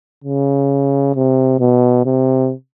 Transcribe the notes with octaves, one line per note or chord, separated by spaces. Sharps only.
C#3
C3
B2
C3